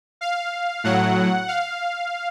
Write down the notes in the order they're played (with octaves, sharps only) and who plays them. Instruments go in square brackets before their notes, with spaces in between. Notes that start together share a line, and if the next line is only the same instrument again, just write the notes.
[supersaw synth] F5
A2 F#3 F#5
F5